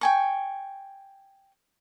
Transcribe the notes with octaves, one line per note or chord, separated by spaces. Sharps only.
G5 G#5 C#6